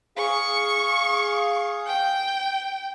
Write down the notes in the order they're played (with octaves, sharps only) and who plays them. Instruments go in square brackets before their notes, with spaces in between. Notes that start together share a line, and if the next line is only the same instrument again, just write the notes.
[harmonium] G#4 F5 [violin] C#6
[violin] G5